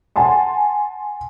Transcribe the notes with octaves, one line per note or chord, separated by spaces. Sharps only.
F#5 G#5 A5 C6